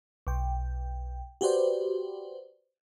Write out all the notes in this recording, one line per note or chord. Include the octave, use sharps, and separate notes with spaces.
B1 G5
F#4 G4 B4 C5 D5